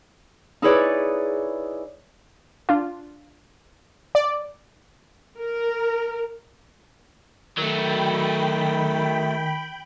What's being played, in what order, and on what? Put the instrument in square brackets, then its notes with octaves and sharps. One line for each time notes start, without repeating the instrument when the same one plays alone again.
[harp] D#4 E4 G#4 B4 C#5 D5
[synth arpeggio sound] D4 F4
[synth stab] D5
[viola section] A#4
[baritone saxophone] D#3 [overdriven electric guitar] F#3 A3 [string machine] G5 B5